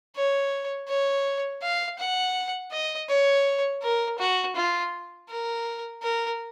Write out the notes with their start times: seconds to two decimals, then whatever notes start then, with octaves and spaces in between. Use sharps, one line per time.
0.16 C#5
0.88 C#5
1.63 F5
1.99 F#5
2.72 D#5
3.09 C#5
3.82 A#4
4.19 F#4
4.56 F4
5.29 A#4
6.03 A#4